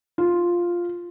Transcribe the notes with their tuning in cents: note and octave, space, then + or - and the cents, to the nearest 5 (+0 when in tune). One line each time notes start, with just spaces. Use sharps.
F4 +0